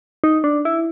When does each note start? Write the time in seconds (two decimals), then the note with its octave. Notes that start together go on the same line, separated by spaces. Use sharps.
0.24 D#4
0.44 D4
0.65 E4